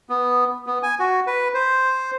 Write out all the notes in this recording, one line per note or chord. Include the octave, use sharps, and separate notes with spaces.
B3
B3
G#5
F#4
B4
C5